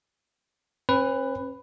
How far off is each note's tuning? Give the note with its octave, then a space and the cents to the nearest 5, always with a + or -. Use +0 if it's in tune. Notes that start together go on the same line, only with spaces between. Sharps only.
C#4 -45 B4 +10